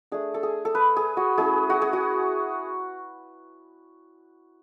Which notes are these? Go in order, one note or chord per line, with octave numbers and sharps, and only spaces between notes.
A3 D4 G#4
A4
G#4
A4
B4
G#4
F#4
A3 C#4 E4 G#4
F#4
G#4
F#4